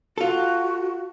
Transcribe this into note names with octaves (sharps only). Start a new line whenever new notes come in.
F4 F#4 A4